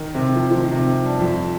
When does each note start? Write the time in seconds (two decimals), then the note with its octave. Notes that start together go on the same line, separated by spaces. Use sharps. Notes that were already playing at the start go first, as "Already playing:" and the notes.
Already playing: D#3
0.15 C3
0.35 F3
0.50 F3
0.57 D#3
0.72 C3
1.04 G2
1.20 F2